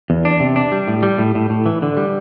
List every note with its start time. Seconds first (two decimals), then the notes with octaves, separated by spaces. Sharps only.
0.10 E2
0.25 D4
0.40 C3
0.56 D4
0.72 G3
0.88 A2
1.03 G3
1.18 A2
1.35 A2
1.50 A2
1.66 E3
1.82 D3
1.97 G3